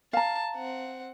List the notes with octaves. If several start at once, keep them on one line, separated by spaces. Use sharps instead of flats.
F5 A5 A#5
C4 F#5